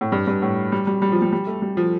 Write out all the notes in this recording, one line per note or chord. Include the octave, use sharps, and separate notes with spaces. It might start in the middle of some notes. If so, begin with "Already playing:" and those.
A2
G2
G2
A2
G3
G3
G3
F3
G3
G3
A3
G3
F3